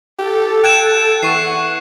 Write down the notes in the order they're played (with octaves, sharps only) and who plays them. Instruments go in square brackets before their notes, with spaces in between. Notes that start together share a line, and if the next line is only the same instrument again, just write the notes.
[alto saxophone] G4 [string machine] A4
[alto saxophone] G5 [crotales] F#6 G#6 E7
[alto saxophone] E3 [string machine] F#5 [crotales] C#6 C7